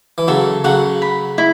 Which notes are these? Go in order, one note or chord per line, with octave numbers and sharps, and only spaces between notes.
E3
C#3 F#3 A4
C#3 F#3 F#5
B5
E4